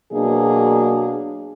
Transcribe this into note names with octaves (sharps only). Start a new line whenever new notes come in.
B2 F#3 A#3 D4 G#4